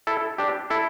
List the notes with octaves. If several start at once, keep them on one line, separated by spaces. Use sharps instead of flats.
E4 A4
D4 G4
E4 A4